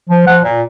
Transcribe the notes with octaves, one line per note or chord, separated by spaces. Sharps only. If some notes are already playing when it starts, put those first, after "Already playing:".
F3
F3 F#5
A#2